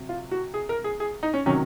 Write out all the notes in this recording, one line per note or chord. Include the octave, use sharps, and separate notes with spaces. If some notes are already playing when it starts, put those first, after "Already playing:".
Already playing: C3 F#3
F4
F#4
G#4
A#4
G#4
G#4
D#4
C#4
C3 D#3 F#3 C#4